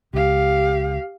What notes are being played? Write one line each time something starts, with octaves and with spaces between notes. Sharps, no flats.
C#2 G4 F5